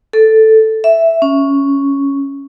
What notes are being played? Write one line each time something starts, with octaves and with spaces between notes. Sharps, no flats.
A4
E5
C#4